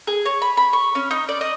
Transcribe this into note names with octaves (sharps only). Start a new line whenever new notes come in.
G#4
C#5
B5
B5
C#6
C#4
D#4
D5
D#5